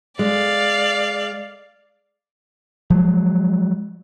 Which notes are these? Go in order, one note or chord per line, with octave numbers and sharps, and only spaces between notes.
G#3 D5 F5
F3 F#3 G#3